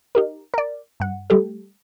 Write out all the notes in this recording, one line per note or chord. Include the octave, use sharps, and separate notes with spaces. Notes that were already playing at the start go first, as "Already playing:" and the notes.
D#4 G4 A#4
A#4 D5
G2 F#5
G3 A3 G4 A4